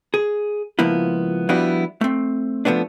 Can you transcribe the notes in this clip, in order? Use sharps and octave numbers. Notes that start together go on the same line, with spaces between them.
G#4
C#2 F3 A#3 B3 E4
F3 G3 B3 D4 E4 F#4
A3 C4
F3 F#3 A3 B3 D4